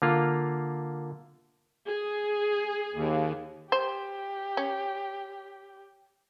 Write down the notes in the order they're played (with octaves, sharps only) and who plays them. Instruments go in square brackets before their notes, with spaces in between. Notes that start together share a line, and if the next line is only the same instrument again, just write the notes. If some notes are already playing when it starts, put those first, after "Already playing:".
[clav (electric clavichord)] D3 A#3 F4
[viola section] G#4
[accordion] D#2
[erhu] G4 [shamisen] C5
[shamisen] C#4